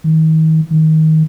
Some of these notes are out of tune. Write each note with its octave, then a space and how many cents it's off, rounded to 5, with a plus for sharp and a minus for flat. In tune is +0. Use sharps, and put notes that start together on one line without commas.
D#3 +35
D#3 +20